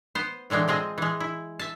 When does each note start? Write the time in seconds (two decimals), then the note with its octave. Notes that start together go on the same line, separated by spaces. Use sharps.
0.15 B3 C5
0.50 A2 D3 E3 G#3 G5
0.68 F3 G#3 C4 D#5
0.98 E3 G#3
1.20 E4
1.59 E5 A5